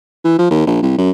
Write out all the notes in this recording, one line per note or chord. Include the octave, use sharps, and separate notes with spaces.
E3
F3
D#2
A#1
C2
F#2